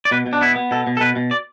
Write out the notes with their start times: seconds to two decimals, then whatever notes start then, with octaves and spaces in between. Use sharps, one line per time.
0.05 D5
0.11 B2 B4
0.26 B2
0.33 D4
0.41 B3 E4
0.56 B3
0.71 B2 A4
0.87 B2
0.97 A4
1.01 B2 B4
1.16 B2
1.31 D5